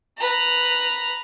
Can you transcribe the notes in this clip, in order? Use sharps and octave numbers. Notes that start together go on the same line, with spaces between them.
B4 A#5